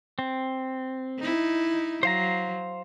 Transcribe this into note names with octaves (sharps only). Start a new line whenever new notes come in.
C4
D#4 E4
F#3 C5 F5 A#5